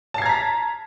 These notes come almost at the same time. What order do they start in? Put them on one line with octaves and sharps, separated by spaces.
A5 C7 G#6 A#5 B6